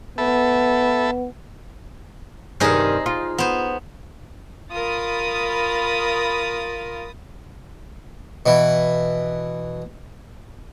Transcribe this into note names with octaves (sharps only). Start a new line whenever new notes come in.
B3 A4 E5 B5
G2 C3 D#3 D#4 G#4 C5
F4
B3 C5
F4 A#4 B5 D#6 A6
B2 E3